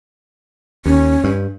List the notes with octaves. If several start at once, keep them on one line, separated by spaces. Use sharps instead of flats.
D#2 C#4
G2